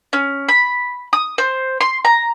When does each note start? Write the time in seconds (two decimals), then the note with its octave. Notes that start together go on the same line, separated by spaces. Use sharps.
0.13 C#4
0.49 B5
1.13 D#6
1.38 C5
1.81 C6
2.05 A#5